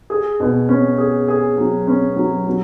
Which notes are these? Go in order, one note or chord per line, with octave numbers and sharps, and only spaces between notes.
G#4
B2
C#4
G#4
G#4
F#3
C#4
F#3
F#3